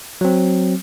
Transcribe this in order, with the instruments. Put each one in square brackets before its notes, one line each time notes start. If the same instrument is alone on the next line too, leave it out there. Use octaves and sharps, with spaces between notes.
[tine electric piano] F#3 C4